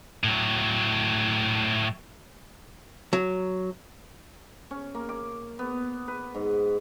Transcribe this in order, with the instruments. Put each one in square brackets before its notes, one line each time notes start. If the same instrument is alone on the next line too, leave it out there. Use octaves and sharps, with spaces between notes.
[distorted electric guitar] A2 F#3
[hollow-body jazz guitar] F#3
[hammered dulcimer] C#4
A#3
D6
B3
B4
G#2